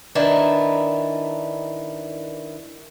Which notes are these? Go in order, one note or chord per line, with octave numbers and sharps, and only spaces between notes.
D#3 D4 E4 A#4 B4